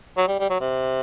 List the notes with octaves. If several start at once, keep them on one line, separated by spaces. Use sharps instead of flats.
F#3
G3
G3
F#3
C3